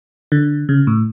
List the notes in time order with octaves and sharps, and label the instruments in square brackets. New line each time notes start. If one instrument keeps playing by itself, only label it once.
[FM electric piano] D3
C#3
A2